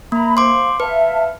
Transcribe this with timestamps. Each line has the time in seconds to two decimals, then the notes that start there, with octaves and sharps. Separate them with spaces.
0.12 A#3 A#5 B5
0.37 C5 F5 C6 D6
0.80 B4 E5 F5 A5